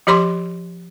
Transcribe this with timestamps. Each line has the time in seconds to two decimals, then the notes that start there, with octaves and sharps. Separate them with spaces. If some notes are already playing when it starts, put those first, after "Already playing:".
0.07 F3 G4 C#5 B5 C6 D6